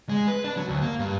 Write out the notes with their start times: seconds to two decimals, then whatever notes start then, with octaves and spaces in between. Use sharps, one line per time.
0.09 G#3
0.28 B4
0.44 D4
0.57 F#3
0.68 D2
0.82 A#3
0.99 G2